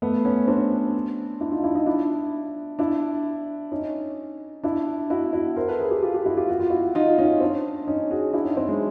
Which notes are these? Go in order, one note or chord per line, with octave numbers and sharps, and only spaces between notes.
A3 B3
B3 C#4
C4 D4
D4 E4
D#4 F4
D4 E4
D#4 F4
D4 E4
D4 E4
C#4 D#4
D4 E4
E4 F#4
E4 F#4
A#4 C5
A4 B4
G#4 A#4
G4 A4
F4 G4
F4 G4
E4 F#4
F4 G4
F#4
F4
E4 F#4
F#4
D#4 F4
C#4 D#4
C4 D4
C#4 D#4
F#4 G#4
D4 E4
C#4 D#4
C4 D4
F#3 G#3